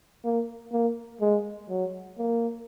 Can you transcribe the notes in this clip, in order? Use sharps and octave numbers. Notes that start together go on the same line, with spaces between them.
A#3
A#3
G#3
F#3
A#3